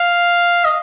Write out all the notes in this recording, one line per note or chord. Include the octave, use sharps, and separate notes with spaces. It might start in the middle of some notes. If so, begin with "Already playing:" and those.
Already playing: F5
D#5